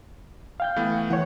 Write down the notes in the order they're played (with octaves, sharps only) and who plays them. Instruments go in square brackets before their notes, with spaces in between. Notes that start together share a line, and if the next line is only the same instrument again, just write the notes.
[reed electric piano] F5 G5 G6
[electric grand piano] E3 A3 B3
[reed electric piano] E3 C#5 [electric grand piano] F#5